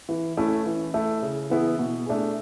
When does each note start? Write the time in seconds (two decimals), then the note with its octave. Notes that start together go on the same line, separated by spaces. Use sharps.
0.09 E3
0.37 A3 C#4 E4
0.66 E3
0.94 A3 E4
1.22 C#3
1.50 E3 B3 E4 G#4
1.79 B2
2.06 A3 D4 G#4